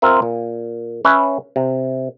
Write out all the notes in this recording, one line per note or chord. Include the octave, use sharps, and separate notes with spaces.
C4 F4 A#4 E5
A#2
C#4 B4 C#5 E5
C3